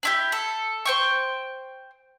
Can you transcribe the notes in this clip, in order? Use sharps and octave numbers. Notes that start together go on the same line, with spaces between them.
D4 E4 G4
A4
C5 G5 C#6